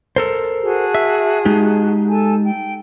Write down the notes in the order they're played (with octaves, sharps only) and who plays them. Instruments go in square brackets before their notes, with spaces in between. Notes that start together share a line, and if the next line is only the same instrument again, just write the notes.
[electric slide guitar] A4 A#4 C5
[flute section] F#4 G#4 A5
[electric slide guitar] E5
G#3 D#4 G4
[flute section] A4 G#5 A5
G5